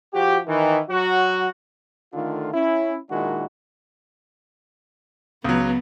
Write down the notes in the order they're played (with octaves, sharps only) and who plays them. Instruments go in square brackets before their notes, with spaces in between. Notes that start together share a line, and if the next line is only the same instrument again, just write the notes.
[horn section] F3 F#4 G4
D#3 E3
F#3 F#4
[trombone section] D3 D#3 A3 F4
C#4 E4
A#2 D#3 G#3 D4 E4 F#4
[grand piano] C#2 F#3 [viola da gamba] B3